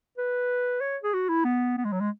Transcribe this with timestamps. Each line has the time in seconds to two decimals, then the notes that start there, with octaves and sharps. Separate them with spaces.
0.18 B4
0.81 C#5
1.03 G#4
1.14 F#4
1.29 E4
1.45 B3
1.77 B3
1.84 G#3
1.92 F#3
2.01 G#3